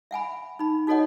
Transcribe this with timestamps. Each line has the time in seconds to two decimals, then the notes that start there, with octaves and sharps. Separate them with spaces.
0.11 E5 F#5 G#5 B5
0.59 D#4 B5
0.87 D#4 F#4 A4 C#5 D#5 F#5